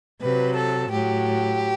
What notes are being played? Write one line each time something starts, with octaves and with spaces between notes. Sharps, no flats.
C3 F#3 B4
A4
A2 F#3 G4